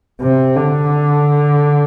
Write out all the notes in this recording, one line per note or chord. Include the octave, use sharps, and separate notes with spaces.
C3
D3